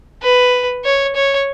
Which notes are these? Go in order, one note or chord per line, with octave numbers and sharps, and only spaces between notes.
B4
C#5
C#5